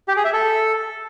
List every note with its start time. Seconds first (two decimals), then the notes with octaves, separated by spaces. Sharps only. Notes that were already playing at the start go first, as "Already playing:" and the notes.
0.08 G4
0.16 G#4
0.25 E5
0.33 A4